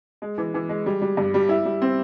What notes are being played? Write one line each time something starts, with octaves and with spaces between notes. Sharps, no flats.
G#3
E3
E3
G#3
G3
G3
G2
G3
E4
G3
C4